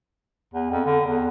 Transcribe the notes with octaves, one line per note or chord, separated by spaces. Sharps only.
E2
F2
D3
E2